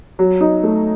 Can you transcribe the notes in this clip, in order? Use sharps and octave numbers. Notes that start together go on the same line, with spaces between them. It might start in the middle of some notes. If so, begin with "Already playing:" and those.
F#3
D#4
A3